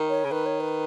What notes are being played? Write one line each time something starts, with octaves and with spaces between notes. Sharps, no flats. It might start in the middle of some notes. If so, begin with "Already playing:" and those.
Already playing: D#3
C#5
C#3
D#3 B4
C#5
B4